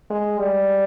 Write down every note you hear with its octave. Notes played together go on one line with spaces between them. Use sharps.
G#3
G3